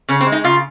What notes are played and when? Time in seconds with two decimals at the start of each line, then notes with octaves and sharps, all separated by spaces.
0.09 C#3 C#4
0.21 C4
0.27 G#3
0.32 D#4
0.44 C#3 F4